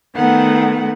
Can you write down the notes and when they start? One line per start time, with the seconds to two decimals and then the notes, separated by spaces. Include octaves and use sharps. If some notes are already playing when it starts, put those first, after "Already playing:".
0.16 D#3 A3 B3 F#5